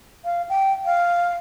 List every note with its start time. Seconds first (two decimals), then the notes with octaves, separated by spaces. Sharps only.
0.25 F5
0.49 G5
0.85 F5